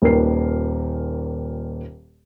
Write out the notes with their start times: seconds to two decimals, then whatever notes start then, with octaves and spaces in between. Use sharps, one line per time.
0.02 D#1 A#2 D#3 A#4 B4 C7